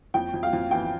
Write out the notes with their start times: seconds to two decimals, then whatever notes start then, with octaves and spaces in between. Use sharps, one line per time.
0.14 F2 G5
0.34 F2
0.43 F5
0.53 F2
0.71 E3 G5